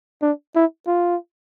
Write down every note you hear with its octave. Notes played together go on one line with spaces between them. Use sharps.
D4
E4
F4